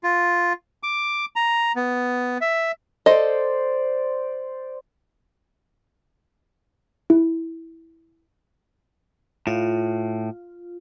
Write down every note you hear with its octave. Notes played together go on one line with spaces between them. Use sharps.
F4
D6
A#5
B3
E5
A4 C5 D5 D#5
E4
A2 F4